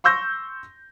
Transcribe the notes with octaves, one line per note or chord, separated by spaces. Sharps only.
C6 C#6 E6 G6 A#6